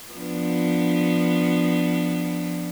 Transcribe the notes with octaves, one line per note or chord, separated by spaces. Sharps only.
F3 B3 D4